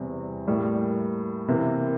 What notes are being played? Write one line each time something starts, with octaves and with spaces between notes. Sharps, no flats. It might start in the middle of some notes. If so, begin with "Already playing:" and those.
Already playing: E2 C3 G3 C4
A2 G3 A#3
C3 E3 A#3